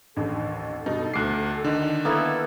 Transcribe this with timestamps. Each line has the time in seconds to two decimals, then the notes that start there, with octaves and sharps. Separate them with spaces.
0.16 A1 D#2 D3 A4
0.86 G2 B2 D#4
1.14 D2 D6 F#6 C7
1.64 D3 D#3 D#4
2.05 A#3 B3 E4 A4